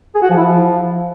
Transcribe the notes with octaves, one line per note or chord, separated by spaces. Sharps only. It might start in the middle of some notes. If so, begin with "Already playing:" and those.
G#4
F#4
F3
E4
F3